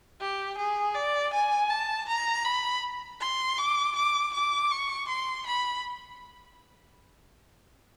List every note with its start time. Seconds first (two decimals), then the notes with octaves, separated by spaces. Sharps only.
0.21 G4
0.58 G#4
0.95 D5
1.33 G#5
1.70 A5
2.08 A#5
2.45 B5
3.21 C6
3.58 D6
3.96 D6
4.34 D6
4.71 C#6
5.08 C6
5.46 B5